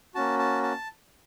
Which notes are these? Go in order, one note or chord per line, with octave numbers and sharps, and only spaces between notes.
A#3 C#4 F#4 A5
A5
A5